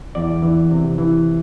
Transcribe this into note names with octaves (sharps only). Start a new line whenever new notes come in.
E2 D5
E3
C3
E3